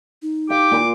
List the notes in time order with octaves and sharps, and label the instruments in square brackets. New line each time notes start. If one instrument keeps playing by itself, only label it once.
[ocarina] D#4
[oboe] G4 [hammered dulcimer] F5 [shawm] D6
[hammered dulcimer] A#2 C6